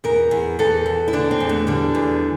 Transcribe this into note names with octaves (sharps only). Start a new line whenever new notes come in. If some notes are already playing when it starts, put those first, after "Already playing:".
E2 A#4
E2
E2 A4
E2
E4
D3 D4
C4
E2
A3
D3 G3
E2